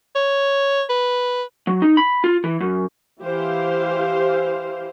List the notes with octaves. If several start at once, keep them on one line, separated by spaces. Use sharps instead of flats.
C#5
B4
F#3
D#4
B5
F4
E3
F#2
E3 G4 C5 F5